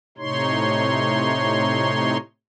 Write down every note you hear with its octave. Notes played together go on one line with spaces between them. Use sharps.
A2 C3 D#4 C#5 C6